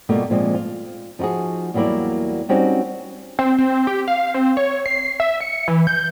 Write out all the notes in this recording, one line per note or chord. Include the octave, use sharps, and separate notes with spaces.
B2 G3 A3 A#3 F4 G4
A#2 F3 G#3 C4
F4
F3 D#4 F4 F#4 G#4
E2 F#3 G3 A#3 E4 D5
G3 C4 C#4 D#4 F#4 G4
C4
C4
G4
F5
C4
C#5
C7
E5
C#7
E3
G6